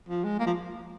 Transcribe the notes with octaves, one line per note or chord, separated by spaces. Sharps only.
F3
G#3
A#3
F3